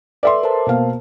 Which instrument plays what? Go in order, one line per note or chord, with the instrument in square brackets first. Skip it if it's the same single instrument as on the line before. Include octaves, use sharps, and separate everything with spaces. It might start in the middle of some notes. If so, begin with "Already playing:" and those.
[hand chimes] A4 B4 [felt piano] D5 E5 C6
[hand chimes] A#4 C5 A5
[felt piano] B2 A#3 F5